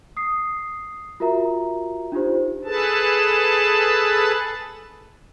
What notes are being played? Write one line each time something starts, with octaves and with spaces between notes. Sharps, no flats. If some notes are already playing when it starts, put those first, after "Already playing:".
D#6 C7
F4 F#4 A#4 E5 A#5
D4 D#4 F4 G4 C5
G#4 A4 B4 A5